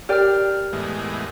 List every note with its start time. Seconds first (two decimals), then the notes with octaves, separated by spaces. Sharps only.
0.09 G4 A#4 D5 G5 F6
0.73 E2 A2 G#3